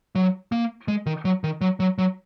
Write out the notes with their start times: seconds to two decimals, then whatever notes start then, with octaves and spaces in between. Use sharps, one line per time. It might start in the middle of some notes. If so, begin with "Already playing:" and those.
0.15 F#3
0.52 A#3
0.88 G#3
1.06 D#3
1.25 F#3
1.44 D#3
1.61 F#3
1.80 F#3
1.98 F#3